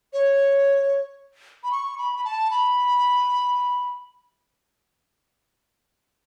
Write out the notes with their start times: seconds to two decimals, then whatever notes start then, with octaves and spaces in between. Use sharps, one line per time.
0.13 C#5
1.64 B5
1.72 C#6
1.98 B5
2.16 B5
2.25 A5
2.51 B5